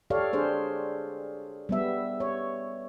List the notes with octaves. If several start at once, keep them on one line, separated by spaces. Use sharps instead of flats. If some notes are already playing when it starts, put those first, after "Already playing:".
G4 A4 C#5 D5 F5
D4 G#4 C5
G3 B3 E5
C#5